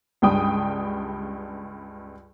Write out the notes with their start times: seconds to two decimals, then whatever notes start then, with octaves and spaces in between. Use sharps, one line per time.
0.22 C#2 G2 G5 D#6